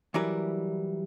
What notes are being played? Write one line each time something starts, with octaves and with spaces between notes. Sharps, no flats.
E3 F#3 G3 E4 A#4 B4